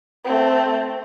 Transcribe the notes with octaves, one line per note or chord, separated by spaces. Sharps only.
A3 C4